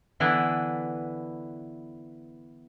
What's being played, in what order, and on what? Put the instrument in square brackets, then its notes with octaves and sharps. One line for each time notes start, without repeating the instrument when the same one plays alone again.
[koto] D3 E3 B3 D4 E4